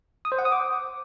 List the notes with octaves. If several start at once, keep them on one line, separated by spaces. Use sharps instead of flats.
D#6
C5
F#5
D#6
D6